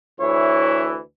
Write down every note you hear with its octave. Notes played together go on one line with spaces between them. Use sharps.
D2 E3 E4 C#5